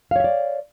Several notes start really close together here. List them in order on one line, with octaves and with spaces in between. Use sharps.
F5 C#5 E5 D5